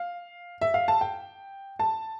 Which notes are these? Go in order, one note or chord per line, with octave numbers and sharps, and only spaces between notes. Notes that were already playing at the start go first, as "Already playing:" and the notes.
Already playing: F5
E5
F5
A5
G5
A5